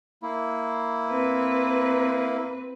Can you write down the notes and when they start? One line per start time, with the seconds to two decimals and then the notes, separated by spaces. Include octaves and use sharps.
0.23 A#3 E4
1.09 C4 B4